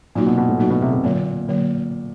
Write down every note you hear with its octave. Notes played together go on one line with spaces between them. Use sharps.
A#2 F#3 A#3 D#4 F#4
B2
B2
A2
F#3 A#3 D#4 F#4
B2
C3
C3
A#2 D3 F#3 A#3
D3 F#3 A#3